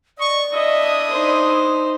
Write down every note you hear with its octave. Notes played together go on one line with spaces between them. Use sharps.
D5 D#5 C#6
D4 E4 D#5 E5 D#6
D#4 C5